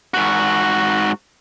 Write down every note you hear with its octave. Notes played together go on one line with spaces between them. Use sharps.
G#2 F#4